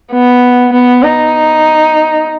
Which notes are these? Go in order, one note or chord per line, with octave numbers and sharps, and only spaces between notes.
B3
B3
D#4